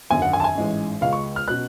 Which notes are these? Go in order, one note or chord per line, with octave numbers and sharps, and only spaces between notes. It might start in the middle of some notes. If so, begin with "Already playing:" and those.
G#1 F#2 D3 G#5
F#5
G#5
A5
G#5
A1 G#2 G#3 C#4
C#2 C#3 G#3 C#4 F5
C#6
F6
B2 F#3 C#4 F#6